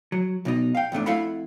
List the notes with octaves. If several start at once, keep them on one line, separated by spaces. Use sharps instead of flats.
F#3
B1 B2 D#4
F5 G5
E2 G#2 A3 D4
F2 A3 E4 F5 F#5 B5